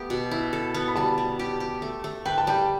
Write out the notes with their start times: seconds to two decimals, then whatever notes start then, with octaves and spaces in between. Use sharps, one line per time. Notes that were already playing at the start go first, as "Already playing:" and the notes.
Already playing: A3 B3 G4
0.10 B2
0.31 E4
0.53 A4
0.74 B3
0.88 B5
0.96 G3 A5
1.18 G3
1.39 G4
1.60 G4
1.82 A3
2.04 A3
2.25 B4 G5
2.38 A5
2.47 G3 G5